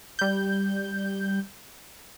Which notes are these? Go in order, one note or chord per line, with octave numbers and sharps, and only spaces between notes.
G3 G6